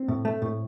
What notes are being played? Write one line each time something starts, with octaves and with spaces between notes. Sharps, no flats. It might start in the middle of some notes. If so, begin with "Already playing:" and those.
Already playing: C4
A2
A3
A2